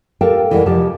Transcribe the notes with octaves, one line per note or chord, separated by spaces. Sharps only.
G4 A4 A#4 F5 G5 A5
F2 E3 G3 G#3 A#4 F#5
F2 C3 F3 G4 A5